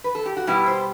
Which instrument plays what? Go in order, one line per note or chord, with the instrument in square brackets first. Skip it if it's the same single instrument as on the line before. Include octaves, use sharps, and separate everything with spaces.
[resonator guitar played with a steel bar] B4
A4
G4
F#4
B2 G3 B3 E4
C5